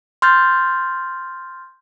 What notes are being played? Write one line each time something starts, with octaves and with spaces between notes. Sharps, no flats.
C6 F6 G6 A6